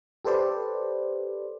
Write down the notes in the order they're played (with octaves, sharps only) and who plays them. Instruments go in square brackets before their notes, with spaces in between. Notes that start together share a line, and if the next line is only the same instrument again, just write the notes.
[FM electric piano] G4 A4 B4 C5 D5